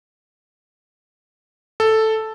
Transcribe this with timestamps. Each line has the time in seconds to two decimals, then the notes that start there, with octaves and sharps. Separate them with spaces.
1.80 A4